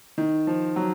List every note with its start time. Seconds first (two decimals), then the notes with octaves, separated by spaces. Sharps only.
0.18 D#3
0.47 F3
0.76 F#3